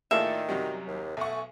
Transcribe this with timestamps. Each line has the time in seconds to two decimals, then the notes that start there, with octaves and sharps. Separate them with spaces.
0.11 A2 D#3 A#3 F4 G#4 A4 D5 E5
0.49 F#2 C3 F#3 G3
0.87 D#2
1.17 B1 A3 F#5 G#5 C#6